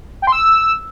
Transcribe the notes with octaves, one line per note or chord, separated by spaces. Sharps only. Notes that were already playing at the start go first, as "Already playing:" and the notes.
G5
C6
E6